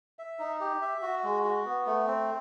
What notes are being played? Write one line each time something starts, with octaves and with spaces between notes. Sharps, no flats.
E5
D#4
G4
E5
F#4
G#3
F#4
B3
A3
C4